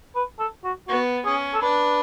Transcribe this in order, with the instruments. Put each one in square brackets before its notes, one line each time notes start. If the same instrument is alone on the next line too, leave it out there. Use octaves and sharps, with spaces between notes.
[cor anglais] B4
A4
F#4
[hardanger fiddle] B3 [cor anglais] F#4
[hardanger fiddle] C#4 [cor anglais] G#4
[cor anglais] A4
[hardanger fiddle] D4 [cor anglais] B4